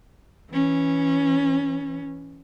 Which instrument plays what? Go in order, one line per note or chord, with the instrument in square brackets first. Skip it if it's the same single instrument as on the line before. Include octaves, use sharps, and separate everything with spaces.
[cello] E3 C#4